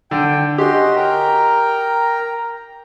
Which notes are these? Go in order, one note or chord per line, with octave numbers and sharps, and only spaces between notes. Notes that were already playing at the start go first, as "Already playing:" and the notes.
D3 G5
C#4 F#4 G4 D#5 C6
A#4 G5 A#5